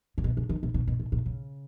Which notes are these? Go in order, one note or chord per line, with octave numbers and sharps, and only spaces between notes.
C#3
B2
C#3
D#3
B2
B2
B2
A#2
A#2
C#3